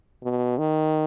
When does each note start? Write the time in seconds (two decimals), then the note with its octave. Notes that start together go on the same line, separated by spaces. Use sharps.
0.23 B2
0.58 D#3